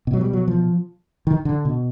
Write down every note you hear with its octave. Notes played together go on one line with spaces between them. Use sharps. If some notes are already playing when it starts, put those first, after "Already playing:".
B2
F#3
G3
F#3
F3
D#3
D3
B2